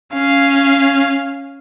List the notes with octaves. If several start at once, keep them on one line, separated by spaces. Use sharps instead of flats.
C#4 F5